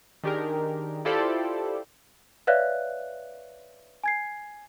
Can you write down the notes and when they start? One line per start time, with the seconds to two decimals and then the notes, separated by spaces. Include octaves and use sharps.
0.24 D#3 D4 G4 G#4 A#4
1.05 E4 F4 G4 A4 C5 D5
2.47 B4 C#5 D5 E5 F5 F#6
4.04 G#5 G#6 C7